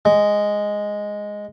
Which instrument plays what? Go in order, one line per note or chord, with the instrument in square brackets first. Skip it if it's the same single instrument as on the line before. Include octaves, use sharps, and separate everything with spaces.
[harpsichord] G#3